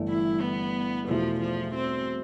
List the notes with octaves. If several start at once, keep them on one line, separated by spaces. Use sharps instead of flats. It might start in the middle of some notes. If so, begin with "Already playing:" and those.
Already playing: G1 G2 E3 A3
E4
B3
E2 B2 F3 A3 E4
F3
C4